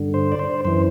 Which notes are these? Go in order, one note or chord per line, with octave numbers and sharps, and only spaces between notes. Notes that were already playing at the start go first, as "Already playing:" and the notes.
Already playing: G2 D3
C5
D5
C5
F#2 E3 C5